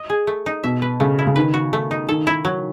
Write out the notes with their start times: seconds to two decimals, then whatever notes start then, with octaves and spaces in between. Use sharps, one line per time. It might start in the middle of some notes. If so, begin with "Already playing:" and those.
Already playing: D#5
0.10 G#4
0.27 A3
0.46 D#4
0.64 B2 E5
0.82 B4
1.00 C#3 A3
1.19 E4
1.27 C#3
1.36 D#3 B4
1.54 F#4
1.73 A3
1.91 D#4
2.09 D#3 A4
2.27 E4
2.45 F#3